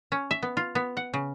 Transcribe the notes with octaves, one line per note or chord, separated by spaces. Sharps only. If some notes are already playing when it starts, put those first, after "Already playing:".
C#4
E5
B3
F4
B3
F#5
C#3